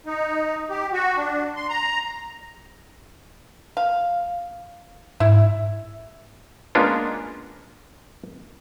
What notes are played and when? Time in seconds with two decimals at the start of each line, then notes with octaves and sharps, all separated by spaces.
0.06 D#4
0.70 G4
0.93 F#4
1.17 D4
1.56 C6
1.69 A#5
3.77 F5
5.20 G#2 E4
6.75 G#3 A#3 B3 C#4 D4 F4